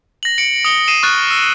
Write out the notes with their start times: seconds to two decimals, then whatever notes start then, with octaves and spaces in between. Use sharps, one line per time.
0.23 A#6 F#7
0.38 C#7 D7 F#7
0.65 D#6 C#7 G7
0.88 D#6 C7 D#7 E7
1.03 C#6 F6 F#6 A6
1.31 E6